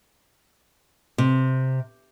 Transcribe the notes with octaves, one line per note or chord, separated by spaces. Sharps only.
C3